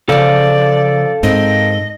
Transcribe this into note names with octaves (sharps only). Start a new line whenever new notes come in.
C#3 F3 A4 D5 F5
G#2 C4 A#4 D#5